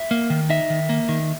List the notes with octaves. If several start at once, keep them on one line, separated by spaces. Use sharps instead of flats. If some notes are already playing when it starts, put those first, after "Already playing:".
Already playing: E5
A#3
D#3
D#4 E5
D#3
A#3
D#3